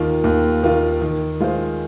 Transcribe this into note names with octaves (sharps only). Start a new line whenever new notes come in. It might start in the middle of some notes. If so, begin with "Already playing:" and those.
Already playing: D#2 D#3 A#3 F4
D#2
D#3 A#3 F4
D#3
G#3 F4 C5